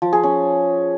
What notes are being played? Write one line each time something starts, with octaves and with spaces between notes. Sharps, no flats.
F3
G#4
C#4